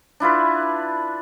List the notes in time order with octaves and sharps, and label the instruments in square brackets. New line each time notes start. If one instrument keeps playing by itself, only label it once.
[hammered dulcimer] D4 E4 F4 B4